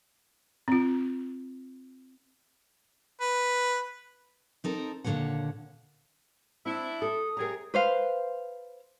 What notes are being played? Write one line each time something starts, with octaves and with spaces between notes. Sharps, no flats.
C4 F4
B4
C4 D#4 A4 A#4
D#2 A#2 D3 F#3 C#5 F#5
C4 D4 E4
A4 D#6
F#2 C3 G#4 A#4 G5 A#5
B4 C5 F5